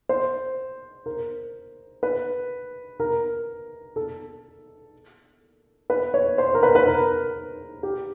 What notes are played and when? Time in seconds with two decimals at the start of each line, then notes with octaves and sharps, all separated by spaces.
0.09 C5
1.06 A#4
2.03 B4
3.00 A#4
3.96 A4
5.90 B4
6.14 C#5
6.38 C5
6.55 A#4
6.63 B4
6.75 B4
6.87 A#4
7.83 G4